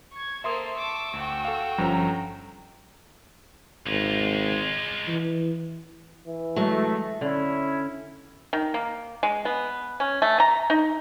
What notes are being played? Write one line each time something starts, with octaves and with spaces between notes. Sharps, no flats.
C#6 G#6
A#3 A4 C5 E5 C6 D#6
A5 C#6 D6 E6
D2 F#4 G5
A4 F5
G1 G2 F3 C#4 A4 A#5
G#1 G#3 F4
E3
E3
F#3 G#3 A3
D3 C#4 E4
D#3
A#3
G#3
B3
C#4
A3
A#5
D#4